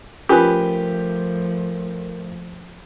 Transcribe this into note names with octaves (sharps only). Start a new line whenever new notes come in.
F3 A3 C#4 F4 G4 A#4 B4 G#5